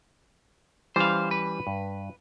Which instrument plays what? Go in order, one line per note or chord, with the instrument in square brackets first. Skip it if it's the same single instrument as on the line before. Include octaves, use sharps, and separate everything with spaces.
[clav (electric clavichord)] E3 G3 C#4 [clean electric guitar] C5 F5
[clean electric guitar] B4
[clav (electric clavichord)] G2